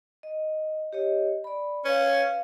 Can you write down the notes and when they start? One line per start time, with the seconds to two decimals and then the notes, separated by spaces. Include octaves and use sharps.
0.23 D#5
0.93 G4 C#5 D#5
1.44 D5 B5
1.85 C#4 B4 F5